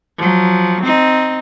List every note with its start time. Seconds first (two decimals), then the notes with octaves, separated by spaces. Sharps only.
0.18 F3 F#3
0.83 C4 D#4